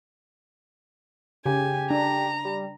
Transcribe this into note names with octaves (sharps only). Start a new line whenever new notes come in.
C#3 G4 G#5
D4 A#5
G3